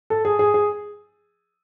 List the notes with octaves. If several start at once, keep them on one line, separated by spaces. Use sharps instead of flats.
A4
G#4
G#4
G#4